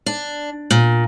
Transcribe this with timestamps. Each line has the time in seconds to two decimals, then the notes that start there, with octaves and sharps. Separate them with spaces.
0.06 D4
0.71 A#2